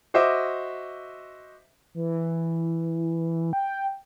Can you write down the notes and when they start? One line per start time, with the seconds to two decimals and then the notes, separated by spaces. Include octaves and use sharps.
0.14 F#4 C5 D#5 E5 D6
1.94 E3
3.53 G5